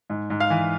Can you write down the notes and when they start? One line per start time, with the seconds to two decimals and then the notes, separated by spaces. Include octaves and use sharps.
0.10 G#2
0.30 G#2
0.40 F5 F6
0.50 E3